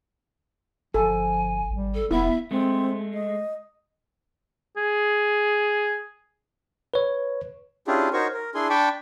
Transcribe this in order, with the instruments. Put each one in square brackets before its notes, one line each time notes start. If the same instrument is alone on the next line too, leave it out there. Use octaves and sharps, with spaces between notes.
[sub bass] G1 [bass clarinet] F3 [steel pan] A4 [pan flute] G#5
[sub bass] G#1 [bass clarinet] G3
[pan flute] A4
[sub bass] E1 [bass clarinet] B3 [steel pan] E4 [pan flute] E5
[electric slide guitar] G#3 A3 [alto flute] C4
[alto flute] D#5
[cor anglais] G#4
[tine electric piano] B4 C#5
[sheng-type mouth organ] C#4 D4 E4 F4 G4 G#4
D#4 F#4 A#4 C5 C#5 C#6
A#4
D4 E4 G#4 G#5 C6
D4 G5 A5 B5 C#6 D6